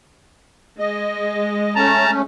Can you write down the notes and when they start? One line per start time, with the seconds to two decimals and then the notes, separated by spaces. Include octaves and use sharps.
0.79 G#3 D#5
1.75 A3 C#4 A5 A#5